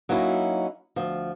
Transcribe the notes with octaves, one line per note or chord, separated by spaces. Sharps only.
F#3 A#3 C#4 D#4 E4
D2 F3